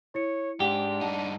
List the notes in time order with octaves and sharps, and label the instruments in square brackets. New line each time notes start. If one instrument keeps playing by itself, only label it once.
[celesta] E4 C#7 [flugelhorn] C#5
[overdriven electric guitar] G#2 [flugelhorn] D4 [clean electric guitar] G4 [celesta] F#5
[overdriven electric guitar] G2 D#4 [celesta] F#5 A5